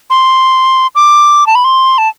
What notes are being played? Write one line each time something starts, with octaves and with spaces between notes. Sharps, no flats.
C6
D6
A5
B5
C6
A5